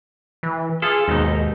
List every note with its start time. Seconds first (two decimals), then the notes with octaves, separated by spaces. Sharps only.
0.43 E3
0.82 F4 G#4 A4
1.08 D#2 G#2 B2 D#4